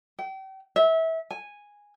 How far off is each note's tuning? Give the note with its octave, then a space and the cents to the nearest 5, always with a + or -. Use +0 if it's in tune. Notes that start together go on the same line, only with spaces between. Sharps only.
G5 -35
E5 -25
G#5 -10